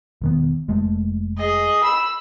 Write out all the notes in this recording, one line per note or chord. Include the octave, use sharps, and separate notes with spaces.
E1 D#3 B3
F1 G#3 A3
G#4 D#5
B5 E6